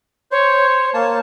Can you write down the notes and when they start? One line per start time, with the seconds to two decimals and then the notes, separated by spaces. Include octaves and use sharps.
0.31 C5 C#5
0.94 A#3 A5